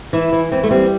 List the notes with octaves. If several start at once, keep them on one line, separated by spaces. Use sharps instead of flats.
E3 E4
E3
E3 C4
A3
G3 C4